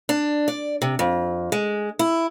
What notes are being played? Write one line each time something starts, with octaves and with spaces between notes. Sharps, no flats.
D4
D5
C3
F2
G#3
E4